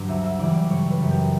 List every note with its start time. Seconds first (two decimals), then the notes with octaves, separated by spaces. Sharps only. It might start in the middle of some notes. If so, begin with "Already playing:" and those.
Already playing: G2 D3 F#3 D5
0.08 D2 E5
0.24 E5
0.39 C#3 E3 G3 D5
0.54 D5
0.70 G1 C#5
0.90 B4
1.00 F#2 C#3
1.11 G4